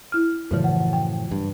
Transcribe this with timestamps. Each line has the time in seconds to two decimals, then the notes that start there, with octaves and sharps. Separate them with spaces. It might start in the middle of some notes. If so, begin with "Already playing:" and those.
0.12 E4 F6
0.51 F#2 A2 C#3 E3 F3
0.64 F#5
0.93 G5
1.31 G2